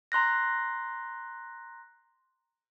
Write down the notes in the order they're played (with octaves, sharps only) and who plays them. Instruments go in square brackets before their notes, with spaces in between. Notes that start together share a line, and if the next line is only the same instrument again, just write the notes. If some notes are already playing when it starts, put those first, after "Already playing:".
[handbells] A#5 C6 F#6 A#6